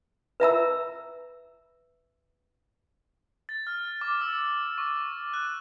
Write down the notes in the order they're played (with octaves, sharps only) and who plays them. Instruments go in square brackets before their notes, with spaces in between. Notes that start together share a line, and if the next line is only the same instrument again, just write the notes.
[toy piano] B4 E5 A#5 E6
[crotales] A6
F6
D6
E6
C#6
F#6